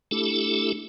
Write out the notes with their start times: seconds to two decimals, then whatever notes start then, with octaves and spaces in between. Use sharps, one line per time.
0.11 A3 D4 E4 G4 A4